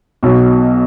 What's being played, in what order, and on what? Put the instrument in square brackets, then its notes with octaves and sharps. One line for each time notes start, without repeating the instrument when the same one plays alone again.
[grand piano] B1 B2 F#3